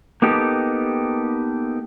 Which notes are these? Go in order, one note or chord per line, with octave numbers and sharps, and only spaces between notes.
A#3 B3 D#4 G4 A4